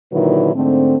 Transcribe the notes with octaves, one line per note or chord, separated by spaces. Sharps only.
A#2 D3 D#3 F#3 E4 B4
G#2 D3 A3 C4